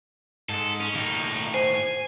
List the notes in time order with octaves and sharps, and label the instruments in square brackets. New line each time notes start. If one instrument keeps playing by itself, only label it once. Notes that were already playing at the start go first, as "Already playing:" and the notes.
[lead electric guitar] G#2 G#3 [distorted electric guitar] A4
[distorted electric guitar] C#4
[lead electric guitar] D#2 A2 [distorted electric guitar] A#3 D#4
[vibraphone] C5 [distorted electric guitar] G#5